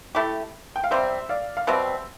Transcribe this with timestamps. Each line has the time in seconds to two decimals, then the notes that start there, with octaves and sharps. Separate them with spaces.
0.15 A3 E4 G4
0.76 G5
0.84 F5
0.91 C3 G3 C4 C5 E5
1.29 D5 F5
1.57 F5
1.67 B2 G3 C4 E5 G5